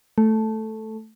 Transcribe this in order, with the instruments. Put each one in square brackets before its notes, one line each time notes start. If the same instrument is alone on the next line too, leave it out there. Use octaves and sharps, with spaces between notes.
[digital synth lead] A3